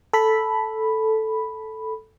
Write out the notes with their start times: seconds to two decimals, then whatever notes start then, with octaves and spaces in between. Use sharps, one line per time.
0.13 A4 B5